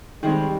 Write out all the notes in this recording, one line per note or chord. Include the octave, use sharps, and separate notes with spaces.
D#3 G3 G#3 C4